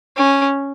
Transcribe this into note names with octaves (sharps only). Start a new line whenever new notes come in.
C#4